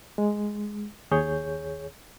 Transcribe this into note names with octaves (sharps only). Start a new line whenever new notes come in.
G#3
D#2 G#4 C#5 G6